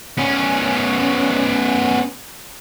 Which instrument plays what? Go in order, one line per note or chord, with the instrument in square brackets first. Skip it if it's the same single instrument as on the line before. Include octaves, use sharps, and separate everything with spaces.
[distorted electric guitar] B3 C#4